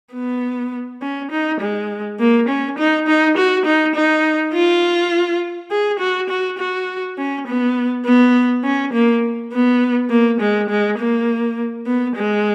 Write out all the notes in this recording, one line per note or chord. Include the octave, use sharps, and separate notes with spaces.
B3
C#4
D#4
G#3
A#3
C#4
D#4
D#4
F#4
D#4
D#4
F4
G#4
F#4
F#4
F#4
C#4
B3
B3
C#4
A#3
B3
A#3
G#3
G#3
A#3
B3
G#3